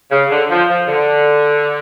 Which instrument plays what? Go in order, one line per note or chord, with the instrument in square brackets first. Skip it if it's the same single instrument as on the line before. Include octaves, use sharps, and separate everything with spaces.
[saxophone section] C#3
D3
F3
F3
D3